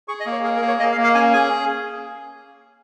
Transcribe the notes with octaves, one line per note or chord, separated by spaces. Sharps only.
G#4 C#6
D#5
A#3
C#5
G#4 A#4
A#4
A#3
C#5
A#3 D#5
F5
A#3
F5
C#4 G#5
G#4 G#5